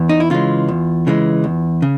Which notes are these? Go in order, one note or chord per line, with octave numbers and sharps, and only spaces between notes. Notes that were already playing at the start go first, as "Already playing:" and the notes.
Already playing: E2
D#4
E4
C#3 E3 G#3 F4
E2
C#3 E3 G#3
E2
C#3